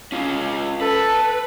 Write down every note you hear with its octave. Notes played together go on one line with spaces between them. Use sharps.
C#4 F4
A4 B4